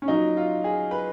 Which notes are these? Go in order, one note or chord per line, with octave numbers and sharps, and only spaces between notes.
C#4
A#2 F#3 D#4
F4
G#4
B4